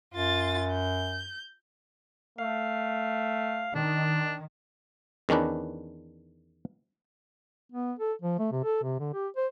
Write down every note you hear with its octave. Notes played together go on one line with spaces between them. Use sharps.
F#2 F4 A6
G6
A3 F5
D#3 D4
E2 D#3 C#4 D4 B4
B3
A4
F3
A3
C3
A4
C3
D3
G4
C5